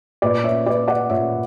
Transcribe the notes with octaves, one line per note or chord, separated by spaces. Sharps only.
A#2 B4 D5
C#5 E5
B4 D5
D5 F#5
A#2 C#5 E5